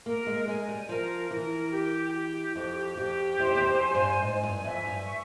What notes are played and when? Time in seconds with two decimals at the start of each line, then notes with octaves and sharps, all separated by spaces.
0.06 A#3 A#4
0.27 G#3
0.48 G#3 G#5
0.69 G3
0.89 F3 A#4
1.31 E3 A#4
1.73 G4
2.15 G4
2.56 F2 G4
2.97 F2 G4
3.39 E2 C5
3.47 F2
3.55 E2
3.67 F2
3.81 G#5
3.95 G2
4.22 G#2 G#5
4.43 G2
4.64 F2 E5
4.85 G2
5.06 C#6